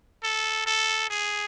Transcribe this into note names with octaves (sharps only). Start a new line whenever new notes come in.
A4
A4
G#4